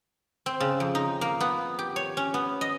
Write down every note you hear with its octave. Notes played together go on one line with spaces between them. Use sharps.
C4
C#3
F2
D#4
A#3
B3
G4
C#5
C#4
B3
D#5